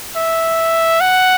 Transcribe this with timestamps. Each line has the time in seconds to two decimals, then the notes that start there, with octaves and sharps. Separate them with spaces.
0.16 E5
1.01 F#5